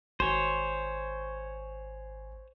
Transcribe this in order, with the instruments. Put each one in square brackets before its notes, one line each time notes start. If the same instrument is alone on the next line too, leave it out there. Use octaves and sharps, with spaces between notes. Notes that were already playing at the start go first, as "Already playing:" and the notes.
[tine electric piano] G#1 G#5 [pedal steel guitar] C5 C#5